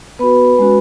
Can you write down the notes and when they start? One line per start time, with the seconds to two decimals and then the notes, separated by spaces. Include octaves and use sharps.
0.19 B3 F#4 B4 B5
0.58 G#3 C#4 F#4